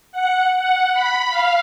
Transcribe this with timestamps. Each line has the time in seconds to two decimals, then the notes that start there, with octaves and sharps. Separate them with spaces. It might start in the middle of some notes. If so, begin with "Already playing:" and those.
0.12 F#5
0.57 F#5
0.94 B5
1.30 F5